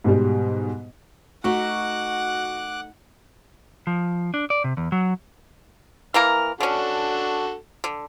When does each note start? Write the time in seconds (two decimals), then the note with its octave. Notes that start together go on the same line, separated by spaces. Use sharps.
0.04 G#2 B2 G3
1.44 A3 D#4 F#4 F#5 D6 F#6
3.87 F3
4.34 D4
4.50 D5
4.64 C3
4.77 E2
4.92 F#3
6.14 E3 A#3 A#4 F6
6.60 D3 C#4 D4 F#4 A4
7.84 D3